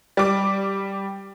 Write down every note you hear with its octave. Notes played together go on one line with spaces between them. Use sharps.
G3 D6